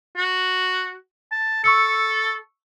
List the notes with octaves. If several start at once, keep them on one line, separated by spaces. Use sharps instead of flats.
F#4
A5
A4 C#6 E6 C#7